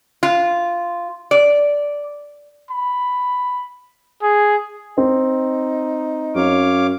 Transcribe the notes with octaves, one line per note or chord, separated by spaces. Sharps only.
F4
D5
B5
G#4
C4 D#4
F#2 C#5 F5 D6